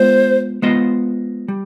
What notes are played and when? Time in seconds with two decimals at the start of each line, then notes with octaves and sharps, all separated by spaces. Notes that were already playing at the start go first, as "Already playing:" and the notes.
Already playing: G#3 B3 F4 C5
0.62 G#3 B3 F4 C5 D#5
1.48 G3